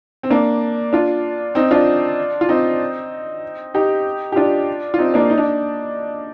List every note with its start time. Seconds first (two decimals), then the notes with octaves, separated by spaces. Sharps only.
0.23 C4
0.30 A#3 D4
0.93 D4 F4
1.55 C4 D#4
1.71 D4 F4
2.41 F4
2.49 C4 D#4
3.74 D#4 G4
4.32 G4
4.36 D4 F4
4.94 F4
4.98 C4 D#4
5.14 A#3 D4
5.30 D#4
5.38 D4